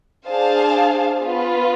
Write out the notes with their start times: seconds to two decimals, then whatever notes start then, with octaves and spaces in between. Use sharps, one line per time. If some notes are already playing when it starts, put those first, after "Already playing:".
0.27 D4 G#4 C5 F5 A5
1.22 B3 F4 B4